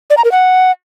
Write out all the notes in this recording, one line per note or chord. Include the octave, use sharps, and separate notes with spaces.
D5
A#5
A#4
F#5